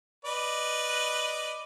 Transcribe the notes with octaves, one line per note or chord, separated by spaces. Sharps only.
B4 D5 D#5